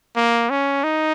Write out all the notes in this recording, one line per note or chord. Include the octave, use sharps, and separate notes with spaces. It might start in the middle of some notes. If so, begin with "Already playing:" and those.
A#3
C#4
D#4